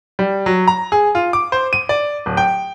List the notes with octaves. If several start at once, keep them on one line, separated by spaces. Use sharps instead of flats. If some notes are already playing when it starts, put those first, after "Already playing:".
G3
F#3
A#5
G#4
F4
D6
C5
D#7
D5
D1
G5